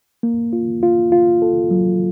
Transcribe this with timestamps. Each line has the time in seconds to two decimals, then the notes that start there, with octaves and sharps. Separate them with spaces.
0.23 A#3
0.53 F4
0.83 F4
1.12 F4
1.42 A4
1.71 F#3